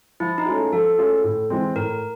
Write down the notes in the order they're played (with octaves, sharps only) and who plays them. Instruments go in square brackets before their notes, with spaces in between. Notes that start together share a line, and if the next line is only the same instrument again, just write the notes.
[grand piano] F3 [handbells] E4
[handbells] D#4
[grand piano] A3 C#4 F4 G#4
[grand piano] F3 [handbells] A4
[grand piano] A3 C#4 F4 G#4
A2
E3 G#3 C4
[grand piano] A2 [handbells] A#4